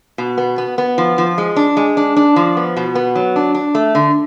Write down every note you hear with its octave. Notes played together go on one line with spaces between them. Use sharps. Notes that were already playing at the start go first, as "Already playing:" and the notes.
B2
B3
B3
B3
F3
F3
G#3
D4
G#3
D4
D4
F3
B3
B2
B3
F#3
D4
D4
A3
D3